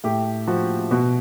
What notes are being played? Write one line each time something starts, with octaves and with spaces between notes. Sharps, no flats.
A2 G4
F3 F#4
B2 F#4